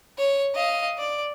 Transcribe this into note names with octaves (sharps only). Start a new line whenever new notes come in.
C#5
D#5 F5
D5